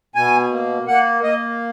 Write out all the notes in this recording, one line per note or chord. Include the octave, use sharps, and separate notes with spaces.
B2 G#5
A#3
A#3 F#5
A#3 D#5